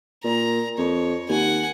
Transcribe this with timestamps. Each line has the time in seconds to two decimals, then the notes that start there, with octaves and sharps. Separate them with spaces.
0.24 A#2 A#5
0.78 F2 C#5
1.29 D#2 F#5 G#5